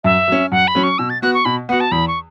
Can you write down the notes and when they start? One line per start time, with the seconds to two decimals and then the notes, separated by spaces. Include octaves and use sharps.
0.04 F#2 E5
0.28 F#3 C#4
0.51 F#2 F#5
0.68 B5
0.75 F#3 C#4
0.83 C#6
0.98 B2 E6
1.10 A6
1.22 B3 F#4 F#6
1.34 C#6
1.45 B2 B5
1.69 B3 F#4 F#5
1.81 A5
1.92 E2 B5
2.08 C#6